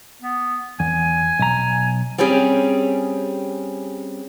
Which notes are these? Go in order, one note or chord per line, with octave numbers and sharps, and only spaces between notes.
B3
E2 G#5
B1 A#5
G3 C4 C#4 G4 G#4